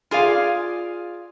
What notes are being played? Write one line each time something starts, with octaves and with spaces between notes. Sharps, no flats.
F4 G#4 D5 F5